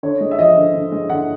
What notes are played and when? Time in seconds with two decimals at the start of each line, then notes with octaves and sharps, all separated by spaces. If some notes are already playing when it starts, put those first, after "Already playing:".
0.03 D3 C#5
0.21 G#3
0.31 E5
0.39 F3 D#5
0.57 D3
0.74 D3
0.92 G#3
1.10 D3 F#5